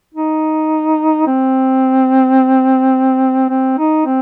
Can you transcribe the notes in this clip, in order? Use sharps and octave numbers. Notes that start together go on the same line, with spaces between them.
D#4
C4
C4
D#4
C4